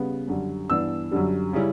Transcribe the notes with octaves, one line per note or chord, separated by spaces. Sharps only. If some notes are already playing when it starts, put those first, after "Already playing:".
Already playing: C#3 G3 B3
F#2 D3 G3
G2 E3 B3 D4 E6
F#2 D3 G3
C#3 G3 C#4 E4